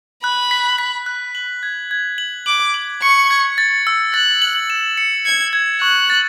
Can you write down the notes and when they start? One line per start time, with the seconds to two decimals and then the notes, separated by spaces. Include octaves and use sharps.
0.23 B5 F#6
0.51 B6
0.78 B6
1.06 F#6
1.35 F#7
1.63 G#6
1.91 G#6
2.18 F#7
2.46 D6 F#7
2.74 F#7
3.02 C#6 C#7
3.30 G#6
3.58 A6
3.87 E6
4.14 F#6 A6
4.42 F#7
4.70 E7
4.97 C#7
5.25 G#6 C#7
5.53 G#6
5.81 C#6 F#6
6.10 A6